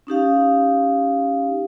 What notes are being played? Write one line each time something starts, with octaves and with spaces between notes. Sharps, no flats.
C#4 D#4 G4 F5